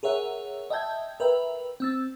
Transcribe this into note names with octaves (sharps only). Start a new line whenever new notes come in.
G#4 A#4 C#5 E5 F#5
D#5 E5 G5 A5 G6 G#6
A#4 B4 E5 G5
C4 E6 A6